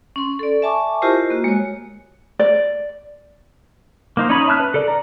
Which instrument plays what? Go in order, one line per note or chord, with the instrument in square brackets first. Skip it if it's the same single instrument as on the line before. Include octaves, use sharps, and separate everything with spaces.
[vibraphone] C#4 C6
A4 D5
E5 G#5 A5 C#6 D6
E4 F4 G4 A#4 C5 D#5
A#3 F#4
G#3 C#5
[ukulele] D5
[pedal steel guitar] A#3 D#4 C5
C#4 D#4 C#5 D#5 B5
E5 A5 F6 F#6
B4
A4 A#4 D5
D5 A#5